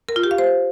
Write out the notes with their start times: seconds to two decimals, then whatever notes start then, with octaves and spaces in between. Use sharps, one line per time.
0.09 A#4
0.16 F4
0.23 G4
0.31 F5
0.38 C5